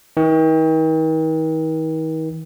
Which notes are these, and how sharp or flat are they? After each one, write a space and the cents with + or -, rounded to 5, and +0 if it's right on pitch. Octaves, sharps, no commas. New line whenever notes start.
D#3 +40